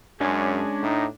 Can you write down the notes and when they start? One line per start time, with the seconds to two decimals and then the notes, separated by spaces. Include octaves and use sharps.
0.21 F#2 G#3 C#4 D4 G#4
0.83 A2 D#4